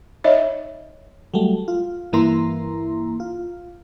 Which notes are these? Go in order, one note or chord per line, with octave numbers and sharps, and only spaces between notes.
D#4 C#5 D#5 E5
F#3 G3 A3
F4
G2 E3 A#3 E4 A#5 C6
F4